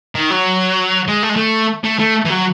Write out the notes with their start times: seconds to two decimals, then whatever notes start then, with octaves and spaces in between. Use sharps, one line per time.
0.15 D#3
0.30 F#3
1.08 G#3
1.23 A3
1.29 G#3
1.36 A3
1.84 A3
1.99 A3
2.25 E3
2.30 F#3